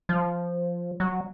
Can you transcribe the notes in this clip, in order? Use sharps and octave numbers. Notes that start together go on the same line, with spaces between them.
F3
F#3